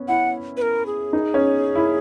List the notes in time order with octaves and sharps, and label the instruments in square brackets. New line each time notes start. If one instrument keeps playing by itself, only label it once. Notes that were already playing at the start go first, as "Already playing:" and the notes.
Already playing: [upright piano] B3 C#4
[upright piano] E4 [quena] F#5
[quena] B4
A#4
G#4
[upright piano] D#4
C#4
E4